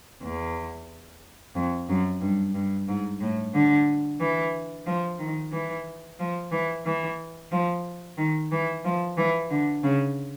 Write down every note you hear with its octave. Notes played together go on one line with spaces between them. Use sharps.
E2
F2
F#2
G2
G2
G#2
A2
D3
E3
F3
D#3
E3
F3
E3
E3
F3
D#3
E3
F3
E3
D3
C#3